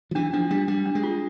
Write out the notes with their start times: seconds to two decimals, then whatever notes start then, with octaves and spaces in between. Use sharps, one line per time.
0.11 F3
0.15 E3 D4
0.33 F3 D4
0.51 G3 D4
0.68 G3 D4
0.86 D4
0.95 G#3
1.04 F4